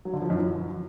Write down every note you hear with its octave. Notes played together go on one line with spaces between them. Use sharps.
F#3
D3
F3
F#2
E3